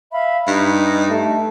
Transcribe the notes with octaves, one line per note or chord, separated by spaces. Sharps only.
E5 F5 B5
G2 D#4
A3